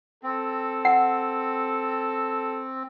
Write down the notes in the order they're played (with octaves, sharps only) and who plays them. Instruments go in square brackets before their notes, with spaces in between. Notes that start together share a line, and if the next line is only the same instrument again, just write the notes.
[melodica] C4 [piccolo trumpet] A4
[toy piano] F#5